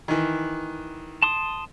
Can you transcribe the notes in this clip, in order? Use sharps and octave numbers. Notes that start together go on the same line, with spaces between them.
D#3 E3
A5 C6 D#6